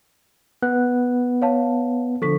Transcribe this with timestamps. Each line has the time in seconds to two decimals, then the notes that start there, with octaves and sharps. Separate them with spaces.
0.63 B3 F#6
1.42 C#5 F5 A5
2.22 D3 F3 A4 C#6 B6